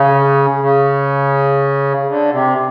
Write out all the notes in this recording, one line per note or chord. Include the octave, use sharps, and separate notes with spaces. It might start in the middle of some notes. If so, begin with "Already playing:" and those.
Already playing: C#3
C#3
D3
C3